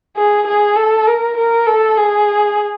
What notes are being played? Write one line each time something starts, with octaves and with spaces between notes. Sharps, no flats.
G#4
G#4
A4
A#4
A#4
A4
G#4